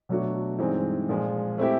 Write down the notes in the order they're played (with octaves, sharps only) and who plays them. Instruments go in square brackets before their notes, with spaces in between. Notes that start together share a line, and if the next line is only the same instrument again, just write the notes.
[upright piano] B2 F#3 A3 D4 F#4
G2 E3 G#3 C4 D#4
A#2 F3 G#3
A3 C4 E4 G4